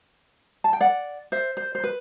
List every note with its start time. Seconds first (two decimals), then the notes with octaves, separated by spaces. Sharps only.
0.64 A5
0.73 G5
0.81 D5 F#5
1.32 C5 E5
1.57 C5
1.75 C5
1.84 B4